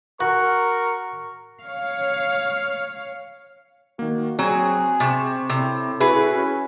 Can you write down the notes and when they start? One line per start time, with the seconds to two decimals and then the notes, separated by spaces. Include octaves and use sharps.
0.20 F#4 A#4 C#6
1.62 C#5 F5
3.99 D#3 A#3 F#4
4.39 F#3 C4 G#4 G#6
5.00 C3 C4 C#6 E7
5.49 A2 C3
6.00 E4 F#4 G#4 B4 E5
6.34 C#4